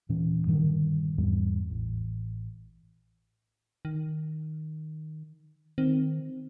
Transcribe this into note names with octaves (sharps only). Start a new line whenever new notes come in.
D#1 A#2 E3 C#4
G2 A#2 D3 D#3
E2 G#2 G3
A1
D#3
D#3 C4